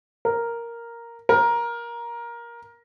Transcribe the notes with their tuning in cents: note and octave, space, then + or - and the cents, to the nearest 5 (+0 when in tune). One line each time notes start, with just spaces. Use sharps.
A#4 +0
A#4 +15